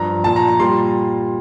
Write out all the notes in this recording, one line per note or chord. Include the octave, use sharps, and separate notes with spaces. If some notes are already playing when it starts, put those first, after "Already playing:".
Already playing: G2 F3 A#5
A#2 F3 A5
A#5
A#5
A#2 G3 C6